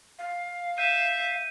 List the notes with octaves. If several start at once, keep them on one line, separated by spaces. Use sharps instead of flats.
F5
E5 G6 D#7